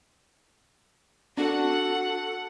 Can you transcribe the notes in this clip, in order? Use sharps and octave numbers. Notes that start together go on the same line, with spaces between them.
D4 F#4 A4 F#5